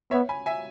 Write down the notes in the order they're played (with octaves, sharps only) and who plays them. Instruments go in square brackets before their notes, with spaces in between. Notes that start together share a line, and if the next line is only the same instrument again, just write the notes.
[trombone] B3 [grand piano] C#5 E5
[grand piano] G#5 B5
E5 G#5